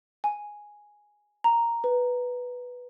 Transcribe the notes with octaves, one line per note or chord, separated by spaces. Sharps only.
G#5
A#5
B4